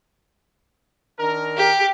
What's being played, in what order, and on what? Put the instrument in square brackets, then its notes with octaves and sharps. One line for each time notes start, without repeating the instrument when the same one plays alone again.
[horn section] D#3 D4 A#4
[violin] G4